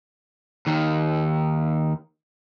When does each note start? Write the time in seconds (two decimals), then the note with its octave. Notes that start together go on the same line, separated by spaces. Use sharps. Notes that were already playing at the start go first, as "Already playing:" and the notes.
0.67 D#2 D#3